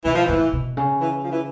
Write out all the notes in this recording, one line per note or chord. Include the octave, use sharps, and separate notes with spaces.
B2 E3
F3
A2 E3
B2
C#3
E3
F3
E3